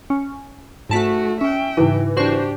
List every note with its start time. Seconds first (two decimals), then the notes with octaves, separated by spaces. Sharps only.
0.10 C#4
0.90 G#2 A3 F#4 A5 B6
1.41 C#4 E5 G5
1.77 G#2 C#3 E3 D#4
2.17 D4 F#4 G4 C5 C#6